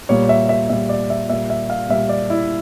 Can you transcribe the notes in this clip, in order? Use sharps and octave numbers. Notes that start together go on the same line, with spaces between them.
A#2 G3 C#5
E5
E5
A#2 G3 E5
D5
E5
A#2 G3 E5
E5
F5
A#2 G3 E5
D5
E4